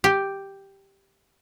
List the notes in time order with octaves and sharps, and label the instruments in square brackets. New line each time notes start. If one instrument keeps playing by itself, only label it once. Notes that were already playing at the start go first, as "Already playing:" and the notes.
[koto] G4